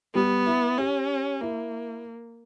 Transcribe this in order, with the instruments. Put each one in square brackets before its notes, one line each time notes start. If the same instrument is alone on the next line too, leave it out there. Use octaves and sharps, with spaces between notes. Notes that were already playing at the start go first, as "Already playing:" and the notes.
[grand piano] G3 [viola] B3
[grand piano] E4
[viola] C#4 [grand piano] G4
[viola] A#3 [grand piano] E4